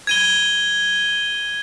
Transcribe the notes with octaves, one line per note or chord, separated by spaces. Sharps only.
G#6 D#7 G7